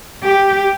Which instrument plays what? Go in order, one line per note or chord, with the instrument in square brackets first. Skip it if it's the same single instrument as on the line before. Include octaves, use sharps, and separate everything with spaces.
[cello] G4